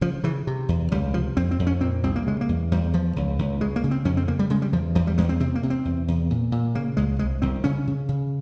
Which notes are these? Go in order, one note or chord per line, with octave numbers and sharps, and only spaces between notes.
C#3 F3
C#3 E3
C3
E2
C#2 G3
C3 F3
F2 C4
C4
F2
C#4
A#2 C4
C2 C4
A#3
C#3 G#3
A#3
E2
E2 G3
E2 F3
C#2
C#2
C#3 G#3
A#3
C#3
C4
F2 C#4
C4
C#3 A#3
G3
C#3 G#3
G3
E2 F3
E2 F3
G3
E2 G#3
C4
C3 C4
A#3
C3
C4
E2
E2
A#2
A#2
C#3 A#3
C#2 G#3
C2 G#3
C2 C4
C#3 C#4
C#3
C#3